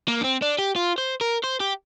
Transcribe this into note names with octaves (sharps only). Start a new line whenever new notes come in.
A#3
D4
C4
D4
G4
F4
C5
A#4
C5
G4